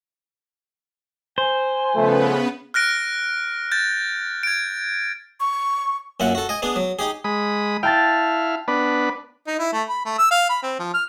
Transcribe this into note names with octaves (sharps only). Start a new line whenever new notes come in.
C5 G#5
C#3 F3 A3 B3 B4
F6 F#6 A#6 D7
G6 A6
G#6 D7
C#6
F#2 A#2 E4 F#5
F#4 A4
D#5 G#5
B3 D4 G#4
F#3
D#4 G4 G#4
G#3 B5 D#6
E4 F5 G5 A5 A6
B3 D4 B4
D#4
E4
A3
B5
A3
E6
F5
B5
C4
F3
F6